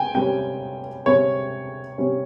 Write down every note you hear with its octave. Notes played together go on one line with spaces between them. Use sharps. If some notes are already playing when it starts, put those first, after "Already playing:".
Already playing: G5 G#5
C3 G3 C#4 G5
C3 G3 C#4 C#5
C3 G3 C#4